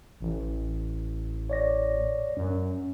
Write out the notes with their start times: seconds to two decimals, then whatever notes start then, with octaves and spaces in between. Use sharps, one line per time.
0.21 A1
1.50 C#5 D5 A#6
2.37 F#2 C#4